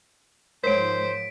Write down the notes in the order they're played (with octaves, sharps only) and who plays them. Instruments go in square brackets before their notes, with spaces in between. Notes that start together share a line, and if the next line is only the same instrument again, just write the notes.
[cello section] G#2 F3 [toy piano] A#4 C#5 F#5 [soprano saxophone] C5 [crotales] B6 D7